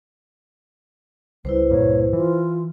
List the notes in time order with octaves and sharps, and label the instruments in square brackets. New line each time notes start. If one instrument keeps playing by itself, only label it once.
[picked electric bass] C#2 [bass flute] G3 [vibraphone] E4 B4 C5
[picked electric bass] C#2 G2 A#2 [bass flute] C#5
[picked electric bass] E3 [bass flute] F4